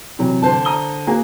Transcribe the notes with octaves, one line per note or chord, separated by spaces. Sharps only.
C3 E3 F#3
D3 C5 A5
A#5 D#6 G7
A#3 F#4 G#4